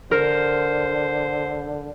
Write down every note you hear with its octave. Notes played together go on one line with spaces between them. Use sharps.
D3 A#4 C5